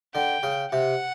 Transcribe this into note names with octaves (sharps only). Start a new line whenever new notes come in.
D3 G5
C#3
C3 F#5